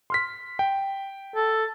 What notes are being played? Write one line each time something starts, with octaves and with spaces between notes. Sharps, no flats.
C6 F6 B6
G5
A4